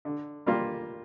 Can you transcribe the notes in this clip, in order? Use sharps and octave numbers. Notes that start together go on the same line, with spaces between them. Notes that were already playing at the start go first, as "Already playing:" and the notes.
D3
G3 A#3 F4